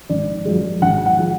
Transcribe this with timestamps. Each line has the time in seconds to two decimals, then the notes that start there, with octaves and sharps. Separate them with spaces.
0.10 G#1 D5
0.45 F#2 F3 G#3
0.82 G#1 F#5
1.06 F#5
1.18 F3 G#3